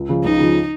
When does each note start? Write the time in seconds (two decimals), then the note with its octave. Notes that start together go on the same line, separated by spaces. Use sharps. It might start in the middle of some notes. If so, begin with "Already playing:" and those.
Already playing: C#2
0.09 C#3 F3
0.24 C#2 D#4
0.39 C#3 F3